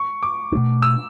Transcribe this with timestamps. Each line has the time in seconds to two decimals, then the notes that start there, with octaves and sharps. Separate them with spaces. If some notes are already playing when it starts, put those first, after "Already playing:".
Already playing: C#6
0.23 D6
0.52 B2 A3 D4
0.82 E6